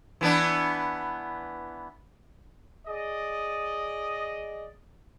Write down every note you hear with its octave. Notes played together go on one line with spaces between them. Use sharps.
E3 B3 D4
G#4 D5 D#5